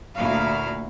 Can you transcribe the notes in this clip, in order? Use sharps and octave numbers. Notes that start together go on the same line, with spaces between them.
D2 A#2 E4 F#4 F5